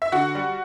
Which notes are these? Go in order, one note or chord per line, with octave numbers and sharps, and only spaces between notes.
E5
D3 F#4 F#5
G3